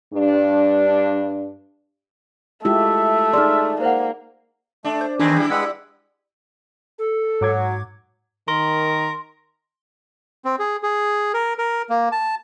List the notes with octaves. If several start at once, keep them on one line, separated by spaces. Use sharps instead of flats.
G2 D4
G#3 A3 E4 F4 G4 E5
D#4 G#4 D5 C6 F6
A#3 C5 F#5
A3 D4
C5
D#2 D#3 C4 D4 G#4 B4
G3 E4
G#3 B4 F#5 E6
A4
G#2 F#3 D6 G#6
D#3 A#4 C6
C4
G#4
G#4
A#4
A#4
A#3
A5